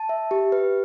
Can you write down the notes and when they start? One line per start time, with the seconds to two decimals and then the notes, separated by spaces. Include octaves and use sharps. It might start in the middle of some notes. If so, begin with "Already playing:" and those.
Already playing: A5
0.09 E5
0.31 G4
0.52 B4